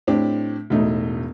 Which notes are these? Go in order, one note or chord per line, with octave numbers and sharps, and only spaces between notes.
A2 C4 D4 G4
E1 A2 A3 D#4